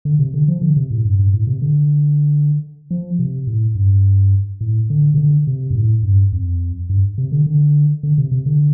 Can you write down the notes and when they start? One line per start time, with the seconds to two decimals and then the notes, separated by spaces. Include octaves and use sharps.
0.05 D3
0.19 C3
0.34 D3
0.48 F3
0.62 D3
0.76 C3
0.91 A2
1.05 G2
1.19 G2
1.34 A2
1.47 C3
1.62 D3
2.91 F3
3.19 C3
3.47 A2
3.75 G2
4.61 A2
4.90 D3
5.14 C3
5.18 D3
5.47 C3
5.70 G2
5.75 A2
6.03 G2
6.32 F2
6.89 G2
7.18 C3
7.32 D3
7.46 D3
8.03 D3
8.18 C3
8.32 C3
8.46 D3